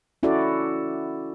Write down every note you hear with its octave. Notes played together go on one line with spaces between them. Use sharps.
C#4 E4 F#4 A4 D5